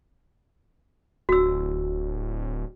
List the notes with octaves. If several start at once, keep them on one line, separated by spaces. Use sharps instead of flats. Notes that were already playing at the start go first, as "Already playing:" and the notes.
D1 F#4 E6